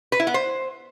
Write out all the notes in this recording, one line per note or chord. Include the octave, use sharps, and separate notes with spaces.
B4
E4
B3
C5